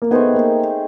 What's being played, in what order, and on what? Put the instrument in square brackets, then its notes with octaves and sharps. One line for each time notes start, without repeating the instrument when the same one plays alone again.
[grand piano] A#3
[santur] A3 C4 D#4 G#4 [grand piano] B3
[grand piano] A#3